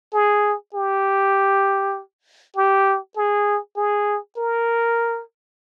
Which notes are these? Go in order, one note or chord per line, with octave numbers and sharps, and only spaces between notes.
G#4
G4
G4
G#4
G#4
A#4